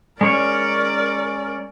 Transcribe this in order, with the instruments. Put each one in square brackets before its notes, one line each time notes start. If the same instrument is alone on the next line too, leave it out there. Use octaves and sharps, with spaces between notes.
[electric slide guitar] G#3 C#4 C#5 [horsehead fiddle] A#4 D5